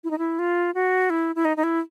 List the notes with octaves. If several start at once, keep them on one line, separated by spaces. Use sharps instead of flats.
E4
D#4
E4
F4
F#4
E4
E4
D#4
D#4
E4